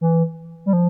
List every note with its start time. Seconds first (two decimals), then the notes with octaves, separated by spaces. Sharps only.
0.01 E3
0.66 G3
0.73 F3